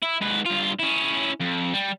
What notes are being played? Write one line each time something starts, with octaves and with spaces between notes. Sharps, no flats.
E4
G#2 B4
G2 F4
C#4 E4
F2
G3